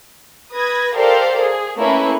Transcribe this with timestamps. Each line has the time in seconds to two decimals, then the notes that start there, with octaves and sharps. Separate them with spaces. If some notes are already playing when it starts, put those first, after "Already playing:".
0.54 B4 D#6 G#6 A#6
0.95 G4 A4 A#4 C5 D5 F5
1.41 G#4
1.78 A3 A#3 C#4 E4 B4